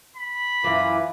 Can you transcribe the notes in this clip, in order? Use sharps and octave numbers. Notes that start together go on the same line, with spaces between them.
B5
F#2 E3 F4 B4 D6